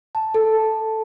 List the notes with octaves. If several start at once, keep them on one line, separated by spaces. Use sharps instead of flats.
A5
A4